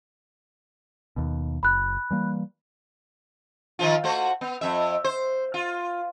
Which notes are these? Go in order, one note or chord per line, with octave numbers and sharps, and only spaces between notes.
D#2 B2
F#1 B5 F#6
E3 G3 A#3
D#3 F3 F4
A3 F#4 C5
B3
F2 E5
C5
F4